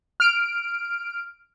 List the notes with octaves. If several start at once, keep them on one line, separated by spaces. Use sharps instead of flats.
F6 D7